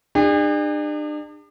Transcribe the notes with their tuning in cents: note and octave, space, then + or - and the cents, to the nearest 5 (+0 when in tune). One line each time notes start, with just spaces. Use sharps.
D4 +40 G#4 -45